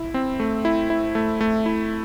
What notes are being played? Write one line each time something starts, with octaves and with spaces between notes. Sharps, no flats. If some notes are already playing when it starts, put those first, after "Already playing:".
Already playing: E4
C4
A3
E4
E4
A3
A3
E4